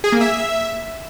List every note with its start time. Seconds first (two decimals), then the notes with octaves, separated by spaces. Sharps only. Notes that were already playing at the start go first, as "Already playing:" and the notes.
0.04 G#4
0.12 A#3
0.21 E5